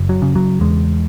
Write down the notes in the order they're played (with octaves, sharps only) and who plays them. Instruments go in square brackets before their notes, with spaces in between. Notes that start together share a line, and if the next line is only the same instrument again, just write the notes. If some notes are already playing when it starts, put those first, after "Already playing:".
Already playing: [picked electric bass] F#1
F#3
C#3
F#3
E2 G#3